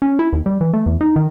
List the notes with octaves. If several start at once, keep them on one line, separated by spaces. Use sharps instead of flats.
C#4
E4
D#2
G3
E3
A3
E2
D#4
D#3